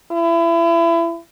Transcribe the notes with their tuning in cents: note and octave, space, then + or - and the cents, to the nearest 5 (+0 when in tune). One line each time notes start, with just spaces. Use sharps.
E4 +30